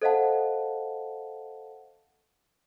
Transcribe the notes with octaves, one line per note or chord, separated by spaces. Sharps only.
A4 C5 D#5 F5 F#5 A5